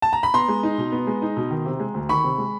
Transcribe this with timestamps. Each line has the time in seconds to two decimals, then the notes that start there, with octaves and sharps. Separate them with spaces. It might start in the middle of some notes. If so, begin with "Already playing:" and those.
0.02 A5
0.13 A#5
0.23 B5
0.34 B3 A#5 C6
0.48 G#3
0.63 D#4
0.78 B2
0.92 B3
1.07 G#3
1.22 D#4
1.37 B2
1.51 D#3
1.66 C3
1.80 G#3
1.94 D2
2.09 D#3 B5 C#6
2.24 C3
2.38 G#3